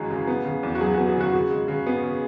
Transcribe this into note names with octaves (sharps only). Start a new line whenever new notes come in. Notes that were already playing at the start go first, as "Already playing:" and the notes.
Already playing: F#2 C#3 E3 G#3 F#4
C#3
B3
C#3
E2
F#4
F#3 G#4
B3 F#4
G#4
C#3 F#4
C#3 F#4
G#3
C#3
B3 G#4
C#3